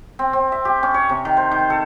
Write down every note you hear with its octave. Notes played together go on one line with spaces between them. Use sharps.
C4
C4
E5
G4
C#4
C#5
C3
D#3
C5
D#3
A4